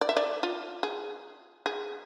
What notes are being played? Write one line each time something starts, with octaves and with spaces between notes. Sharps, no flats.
D5
E5
D5
F4
G#4
G#4